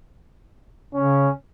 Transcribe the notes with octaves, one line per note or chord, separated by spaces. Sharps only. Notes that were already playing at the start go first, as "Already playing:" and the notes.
C#3 C#4